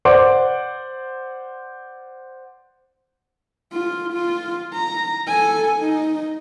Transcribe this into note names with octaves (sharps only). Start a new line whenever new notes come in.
C5 D5 F#5 C6 D6
F4
F4
A#5
A4 G#5
D#4